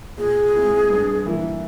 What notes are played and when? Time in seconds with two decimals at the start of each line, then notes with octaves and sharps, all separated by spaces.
0.18 A#2 G#4
0.54 G#3 C4 E4
0.90 G2
1.25 E3 A#3 E4